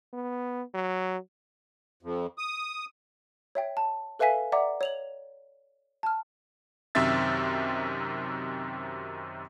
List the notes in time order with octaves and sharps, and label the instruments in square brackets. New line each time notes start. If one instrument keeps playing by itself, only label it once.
[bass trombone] B3
F#3
[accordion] F2
D#6
[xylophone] C#5 E5 G5
A5
A4 B4 E5 F5 G#5 B6
D5 E5 F#5 A#5 D6
C#5 F7 F#7
A5 F6
[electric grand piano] F#2 C3 D#3 C4 E5 A6